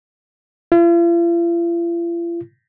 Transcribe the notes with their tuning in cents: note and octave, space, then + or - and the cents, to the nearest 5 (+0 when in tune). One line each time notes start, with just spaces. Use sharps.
F4 -45